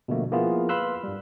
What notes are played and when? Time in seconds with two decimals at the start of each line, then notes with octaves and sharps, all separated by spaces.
0.08 B2 D3 F3 A3 A#3
0.31 F3 A#3 B3 E4 F4 G#4
0.69 B4 F5 B5 C6 E6 F#6
1.03 G2 G3